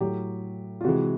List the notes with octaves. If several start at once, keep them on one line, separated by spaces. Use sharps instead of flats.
A2 F#3 G4
F4
C3 E3 G#3 F#4